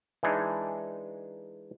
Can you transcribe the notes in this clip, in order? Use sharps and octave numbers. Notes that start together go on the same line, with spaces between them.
E3 G#3 D4 D#4